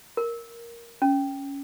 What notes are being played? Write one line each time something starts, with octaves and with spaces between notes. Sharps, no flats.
A#4
C#4